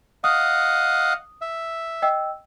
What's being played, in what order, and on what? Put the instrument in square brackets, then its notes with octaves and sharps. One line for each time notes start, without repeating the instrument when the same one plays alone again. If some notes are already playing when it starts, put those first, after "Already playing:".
[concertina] D#5 F5 F#5 [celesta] D#6
[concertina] E5
[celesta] D#5 G5 E6